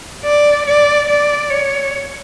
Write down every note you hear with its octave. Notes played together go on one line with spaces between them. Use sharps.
D5
D5
D5
C#5